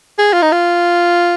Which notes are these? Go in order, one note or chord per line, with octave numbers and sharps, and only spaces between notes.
G#4
F4
D#4
F4